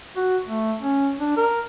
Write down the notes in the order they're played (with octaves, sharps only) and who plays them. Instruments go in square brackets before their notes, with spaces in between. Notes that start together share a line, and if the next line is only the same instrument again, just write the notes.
[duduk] F#4
A3
C#4
D4
A#4